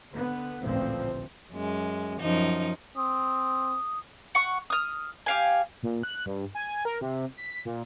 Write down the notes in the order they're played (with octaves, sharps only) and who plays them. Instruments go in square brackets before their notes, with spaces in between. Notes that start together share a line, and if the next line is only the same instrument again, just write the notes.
[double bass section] D3 B3
A1 D2 A#2 F3 C4
[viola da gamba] F#2 G#3
F#2 F3 D#4
[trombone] C4 [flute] D#6
[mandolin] F#5 C#6
D#6 F6
G4 F5 G#5
[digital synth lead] A#2
F#6
G2
G#5
A#4
C3
B6
A#2